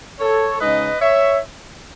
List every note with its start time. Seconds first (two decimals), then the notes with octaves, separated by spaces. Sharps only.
0.20 A4 C#5
0.60 C#3 G#3 D#4 B4 D#5
1.01 C#5 E5